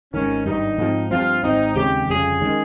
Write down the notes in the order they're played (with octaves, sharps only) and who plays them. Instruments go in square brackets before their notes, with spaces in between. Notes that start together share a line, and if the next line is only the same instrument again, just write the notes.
[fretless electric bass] G#1 G#2 D#3 [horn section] C#4
[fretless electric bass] G#1 G2 G3 [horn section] D#4
[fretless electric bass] G#2 F3 C4
[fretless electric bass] G2 F3 C4 [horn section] F4
[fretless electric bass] G#1 G#2 F3 C4 [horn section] D#4
[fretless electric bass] D#2 C#3 G#3 C4 [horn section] G4
[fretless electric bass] G1 F2 C#3 G3 [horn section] G#4
[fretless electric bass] D#3 G#3 C#4